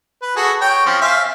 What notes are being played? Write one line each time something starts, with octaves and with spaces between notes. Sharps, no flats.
B4
F#4 G#4 A4
C#5 G5
F3 C4 C#4
E5 F5 G#5